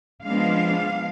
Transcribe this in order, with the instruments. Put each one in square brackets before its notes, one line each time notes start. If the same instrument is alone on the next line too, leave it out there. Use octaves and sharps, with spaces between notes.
[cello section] F3 G#3 B3 D4 F5